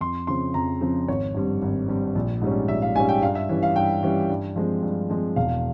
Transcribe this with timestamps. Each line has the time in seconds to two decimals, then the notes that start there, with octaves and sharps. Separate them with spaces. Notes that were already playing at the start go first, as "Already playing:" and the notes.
0.01 F2 C6
0.27 C#3 F3 C4 C6
0.54 F2 A#5
0.81 C#3 F3 C4
1.08 G#1 C#5
1.34 G2 G3 C4
1.62 G#1
1.88 G2 G3 C4
2.15 A#1
2.42 G#2 G3 C#4
2.68 A#1 E5
2.82 F5
2.95 G#2 G3 C#4 G#5
3.09 G5
3.22 G2 F5
3.35 E5
3.49 E3 G3 C#4
3.63 F5
3.76 G2 G5
4.03 E3 G3 C#4
4.30 G2
4.56 F3 G#3 C4
4.82 G2
5.09 F3 G#3 C4
5.36 E1 F5